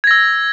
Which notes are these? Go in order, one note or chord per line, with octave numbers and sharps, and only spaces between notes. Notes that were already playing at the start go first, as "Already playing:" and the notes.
E6 G#6 A#6